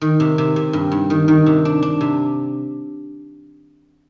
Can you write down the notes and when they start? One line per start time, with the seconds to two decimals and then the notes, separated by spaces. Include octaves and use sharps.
0.01 D#3
0.20 C3
0.38 C3
0.56 C3
0.73 G2
0.92 G2
1.10 D#3
1.28 D#3
1.46 C3
1.65 D4
1.83 D4
2.01 C3